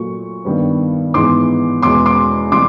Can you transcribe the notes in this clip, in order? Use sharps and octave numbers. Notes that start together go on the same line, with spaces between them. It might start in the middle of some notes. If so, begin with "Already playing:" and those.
Already playing: A#2 F#3 A3 C#6
G2 D#3 G3 B3
G#2 E3 G#3 B3 C6 D6
E2 B2 G#3 B3 C6 D6
C6 D6
C3 E3 G3 C6 D6